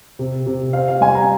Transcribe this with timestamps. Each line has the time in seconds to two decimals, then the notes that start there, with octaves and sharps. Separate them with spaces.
0.19 C3
0.46 C3
0.73 C4 F5
0.88 F5
1.01 G3 G#5
1.15 A#5